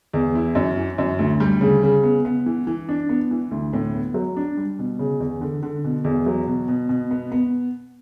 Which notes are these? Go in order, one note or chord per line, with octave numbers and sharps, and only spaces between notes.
E2
E4
F#2
E3
F#2
D2
G3
C#3
C#3
B3
B3
E3
E3
D4
B3
E3
D2
A2
B3
F#3
D4
G3
B2
C#3
E2
D3
D3
B2
E2
F#3
B2
B2
B2
B3
B3